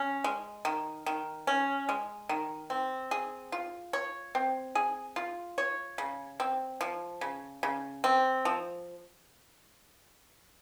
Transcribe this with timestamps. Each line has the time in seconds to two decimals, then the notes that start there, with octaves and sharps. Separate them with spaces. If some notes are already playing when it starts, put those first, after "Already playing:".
Already playing: C#4
0.24 G#3
0.65 D#3
1.06 D#3
1.47 C#4
1.89 G#3
2.29 D#3
2.70 C4
3.11 G#4
3.52 F4
3.93 C#5
4.35 C4
4.75 G#4
5.16 F4
5.58 C#5
5.98 C#3
6.40 C4
6.81 F3
7.21 C#3
7.63 C#3
8.04 C4
8.45 F3